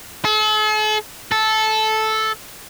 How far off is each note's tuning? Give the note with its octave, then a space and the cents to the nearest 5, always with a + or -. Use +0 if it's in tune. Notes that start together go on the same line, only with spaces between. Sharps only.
A4 -45
A4 -10